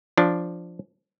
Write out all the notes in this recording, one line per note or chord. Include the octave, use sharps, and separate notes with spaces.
F3 D4